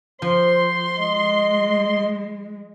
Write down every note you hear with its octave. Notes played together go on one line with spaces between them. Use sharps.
F3 C5 C6
G#3 D#5